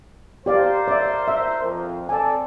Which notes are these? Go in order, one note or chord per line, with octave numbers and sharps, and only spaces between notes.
G4 A#4 C5 D5 F5
D5 E5
E5
F2
C4 A4 D5 G#5 A5